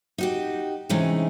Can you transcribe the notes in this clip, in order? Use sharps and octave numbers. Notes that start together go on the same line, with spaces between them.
D#4 F#4 G4
C3 E3 G#3 A3 C#4 D#4